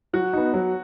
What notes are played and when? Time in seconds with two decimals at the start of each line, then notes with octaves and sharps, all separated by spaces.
0.13 F#3 F#4
0.33 B3 D#4
0.54 F#3